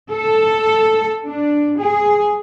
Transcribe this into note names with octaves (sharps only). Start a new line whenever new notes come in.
A4
D4
G#4